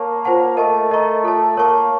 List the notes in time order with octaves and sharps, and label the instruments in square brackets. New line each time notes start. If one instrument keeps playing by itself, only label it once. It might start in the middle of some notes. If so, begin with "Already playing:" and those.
Already playing: [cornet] A#3 [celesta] C#5 A5 C#6
[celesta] F4 C5 F#5 A5
[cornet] A3 [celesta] A#4 D#5 A5 C#6
[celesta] A#4 D#5 A#5 C#6
F4 A4 C#5 A5
[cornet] A#3 [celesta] A#4 C#5 A5 C#6